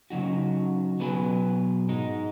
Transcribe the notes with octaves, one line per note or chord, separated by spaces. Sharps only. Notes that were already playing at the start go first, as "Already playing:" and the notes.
C#3 F#3 D#4 F#4
B2 F#3 B3 G#4 B4
G#2 G#3 D#4